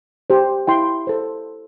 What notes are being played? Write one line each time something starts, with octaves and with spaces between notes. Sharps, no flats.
G4 C5
E4 G5 C6
A4 C5